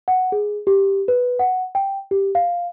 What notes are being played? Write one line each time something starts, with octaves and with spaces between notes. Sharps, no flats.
F#5
G#4
G4
B4
F#5
G5
G4
F5